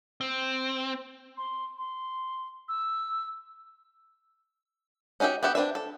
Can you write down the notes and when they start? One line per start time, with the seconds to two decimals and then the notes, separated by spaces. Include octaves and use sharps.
0.21 C4
1.37 C6
1.78 C6
2.69 E6
5.20 C#4 D#4 F#4 G4 E5
5.43 B3 G4 E5 F#5
5.55 C4 D4 B4 E5
5.75 A4